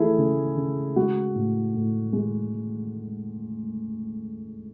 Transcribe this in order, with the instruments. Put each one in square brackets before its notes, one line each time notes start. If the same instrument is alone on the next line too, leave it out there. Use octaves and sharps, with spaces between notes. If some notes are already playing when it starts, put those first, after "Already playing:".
Already playing: [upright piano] E3 A3 E4 G#4
C#3
C#3
G#3 F#4
A2
A2
G#3